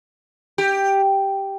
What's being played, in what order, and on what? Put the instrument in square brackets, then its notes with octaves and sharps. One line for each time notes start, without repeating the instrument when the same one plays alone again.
[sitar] G4